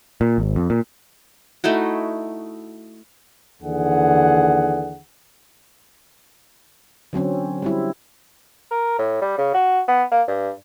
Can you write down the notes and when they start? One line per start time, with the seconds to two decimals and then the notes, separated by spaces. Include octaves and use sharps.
0.21 A#2
0.38 G#1
0.56 F2
0.70 A#2
1.64 A3 D#4 E4 F#4
3.62 D#2 D3 E3 G#4 F#5
7.13 D3 F#3 C4 C#4
7.62 G3 C4 E4
8.71 A#4
8.99 A2
9.21 G3
9.38 C#3
9.54 F#4
9.88 B3
10.12 A#3
10.28 G2